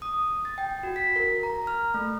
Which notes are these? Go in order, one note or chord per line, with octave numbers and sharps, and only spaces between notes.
D#6
A6
G5
F#4
B6
A#4
A#5
F6
A3